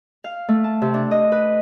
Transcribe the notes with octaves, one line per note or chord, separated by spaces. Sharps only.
F5
A3
A5
C3
D4
D#5
B4